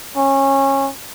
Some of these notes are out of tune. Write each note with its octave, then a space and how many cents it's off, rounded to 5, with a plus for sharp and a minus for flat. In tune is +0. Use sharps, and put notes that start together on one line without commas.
C#4 -20